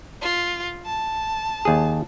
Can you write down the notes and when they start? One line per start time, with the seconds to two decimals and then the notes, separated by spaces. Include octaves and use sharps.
0.22 F4
0.86 A5
1.65 D#2 G#4